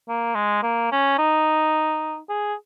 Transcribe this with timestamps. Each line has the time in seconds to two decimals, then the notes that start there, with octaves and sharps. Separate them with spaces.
0.08 A#3
0.35 G#3
0.63 A#3
0.92 C#4
1.18 D#4
2.29 G#4